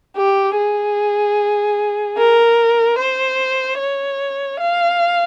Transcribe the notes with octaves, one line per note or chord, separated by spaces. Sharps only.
G4
G#4
A#4
C5
C#5
F5